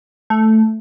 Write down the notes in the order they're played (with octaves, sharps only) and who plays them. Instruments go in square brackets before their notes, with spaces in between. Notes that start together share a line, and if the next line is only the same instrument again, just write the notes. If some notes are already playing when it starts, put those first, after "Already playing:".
[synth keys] A3